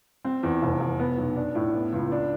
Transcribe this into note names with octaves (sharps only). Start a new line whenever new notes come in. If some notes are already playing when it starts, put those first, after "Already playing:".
C4
E2
F1
F1
B3
B1
D4
A2
B3
C#2
D4